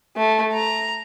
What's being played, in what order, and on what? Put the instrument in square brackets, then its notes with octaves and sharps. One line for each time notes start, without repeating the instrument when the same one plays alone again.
[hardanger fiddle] A3
A#5